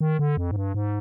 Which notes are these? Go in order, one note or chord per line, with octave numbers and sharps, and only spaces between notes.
D#3
D3
F2
G#2
G2
G#2